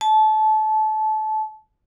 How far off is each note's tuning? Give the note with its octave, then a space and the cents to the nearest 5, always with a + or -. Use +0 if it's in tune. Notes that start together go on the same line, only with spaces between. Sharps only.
A5 -25